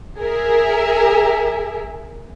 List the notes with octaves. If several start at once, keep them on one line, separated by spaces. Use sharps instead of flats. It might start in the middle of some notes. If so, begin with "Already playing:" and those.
G#4 A#4 E5